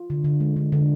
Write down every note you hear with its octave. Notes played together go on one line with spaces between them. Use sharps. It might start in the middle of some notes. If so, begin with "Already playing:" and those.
Already playing: F4
D3
D3
G#3
D3
D3